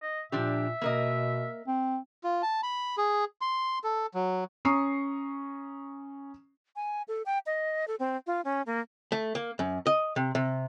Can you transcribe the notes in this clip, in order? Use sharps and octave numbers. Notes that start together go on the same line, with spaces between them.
D#5
A#2 F3 D4 G4 E5
B2 A#3 A#4 D#5
C4
F4
A5
B5
G#4
C6
A4
F#3
C#4 A#5 C#6 D#6 C7
G#5
A4
G5
D#5
A4
C4
F4
C#4
A#3
A3
A#3
F#2
D#5
C3
C3